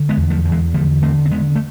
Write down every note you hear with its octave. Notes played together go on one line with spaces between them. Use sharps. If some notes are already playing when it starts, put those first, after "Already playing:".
Already playing: D3
G#3 B3
E2
F3 A3
E2
E3 G#3
D3 F3 A3
D3 A3 C4
C4
D3 G#3 B3
A3